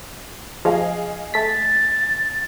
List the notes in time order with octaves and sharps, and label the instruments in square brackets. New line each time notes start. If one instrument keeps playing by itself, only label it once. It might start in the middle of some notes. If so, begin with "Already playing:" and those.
[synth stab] F3 [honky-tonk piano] G#4 D#5 F5
[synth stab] A3 B6 [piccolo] A6